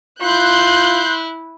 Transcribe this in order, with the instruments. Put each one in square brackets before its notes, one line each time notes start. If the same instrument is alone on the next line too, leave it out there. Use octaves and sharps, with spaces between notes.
[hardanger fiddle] E4 [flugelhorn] F4 [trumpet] C6 [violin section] F#6 G6